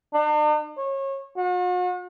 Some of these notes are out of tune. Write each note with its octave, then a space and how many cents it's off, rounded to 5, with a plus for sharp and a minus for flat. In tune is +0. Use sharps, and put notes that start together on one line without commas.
D4 +45
C#5 -30
F#4 -45